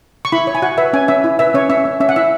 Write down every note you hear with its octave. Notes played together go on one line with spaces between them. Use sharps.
C#6
E4 B5
C#5
G#5
F#4 F#5
B4 E5
C#4 G#5
C#4 E5
E4
B4 E5
C#4 C#5
C#4 E5
C#4
C#4 E5
F#5
E4 E5